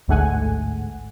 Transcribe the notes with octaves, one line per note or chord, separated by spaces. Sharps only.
A1 D2 G#2 A3 F#5 G#5